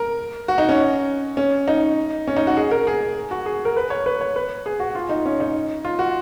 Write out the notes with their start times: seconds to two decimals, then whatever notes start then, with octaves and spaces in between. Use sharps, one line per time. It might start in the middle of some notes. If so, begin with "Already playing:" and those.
Already playing: A#4
0.48 F#4
0.58 D#4
0.69 C#4
1.37 C#4
1.68 D#4
2.28 C#4
2.37 D#4
2.47 F#4
2.57 G#4
2.71 A#4
2.87 G#4
3.31 F#4
3.46 G#4
3.65 A#4
3.77 B4
3.90 C#5
4.06 B4
4.21 C#5
4.36 B4
4.66 G#4
4.80 F#4
4.95 F4
5.09 D#4
5.26 C#4
5.40 D#4
5.85 F4
5.99 F#4